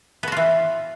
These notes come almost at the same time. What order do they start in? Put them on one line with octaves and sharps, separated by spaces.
B3 F#4 F4 E3